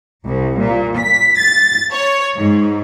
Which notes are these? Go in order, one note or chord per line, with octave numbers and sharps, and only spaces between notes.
C2
A#2
B6
A6
C#5
G#2